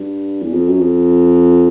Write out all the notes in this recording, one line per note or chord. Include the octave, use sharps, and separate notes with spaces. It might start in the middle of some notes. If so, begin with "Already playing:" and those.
Already playing: G2
E2
F2
F#2
F2